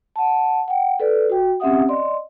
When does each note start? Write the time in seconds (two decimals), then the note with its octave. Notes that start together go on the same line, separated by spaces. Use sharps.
0.16 F#5 A5
0.68 F#5 G5
1.00 A4 B4 D5
1.30 F#4 G5
1.60 C4 C#4 G4 E5 F#5 D#6
1.89 D5 D#5 C6